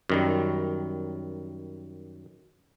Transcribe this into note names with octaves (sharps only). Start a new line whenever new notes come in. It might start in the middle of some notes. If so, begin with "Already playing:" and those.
F#2 D#3 G3